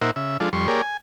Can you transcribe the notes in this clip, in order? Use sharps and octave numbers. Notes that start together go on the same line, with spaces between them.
A#2 D#4 A#4 C5 E5 F#5
C#3 E5
F3 G#3 D4 F4 A4
F2 G3 C6 C#6
A#3 G4 G#4 A#4 C#5 D5
G#5